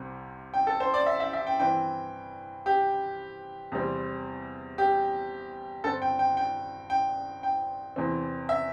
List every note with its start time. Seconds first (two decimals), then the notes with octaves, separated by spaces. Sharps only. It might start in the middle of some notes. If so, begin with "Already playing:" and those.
Already playing: C2 C3 G3 C4
0.54 G5
0.67 A4
0.80 C5
0.94 D5
1.06 E5
1.20 E5
1.33 E5
1.47 G5
1.59 G2 E3 C4 G5
2.66 G4
3.72 E2 C3 G3 C4
4.78 G4
5.84 G2 D3 C4 A4
6.02 G5
6.19 G5
6.37 G5
6.90 G5
7.43 G5
7.96 E2 C3 E3 C4
8.49 E5